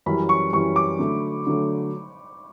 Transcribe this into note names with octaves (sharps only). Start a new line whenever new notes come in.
F#2 E3 G3 C#4 B5
C#6
F#2 E3 G3 C#4 C#6
D6
D3 F#3 A3
D3 F#3 A3